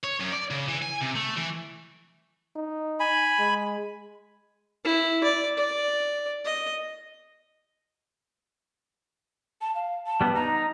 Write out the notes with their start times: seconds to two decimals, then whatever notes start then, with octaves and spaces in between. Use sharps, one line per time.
0.03 C#5
0.20 F#2
0.32 D5
0.51 C#3
0.68 E3
0.82 G#5
1.02 C3
1.16 A3
1.37 E3
2.56 D#4
3.00 G#5 B5
3.39 G#3
4.84 E4
5.24 D5
5.58 D5
6.45 D#5
9.61 A5
9.75 F5
10.06 A5
10.21 G3 B3
10.35 D#4 A#5